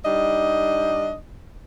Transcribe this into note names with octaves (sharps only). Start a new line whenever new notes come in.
G3 D4 D#4 D#5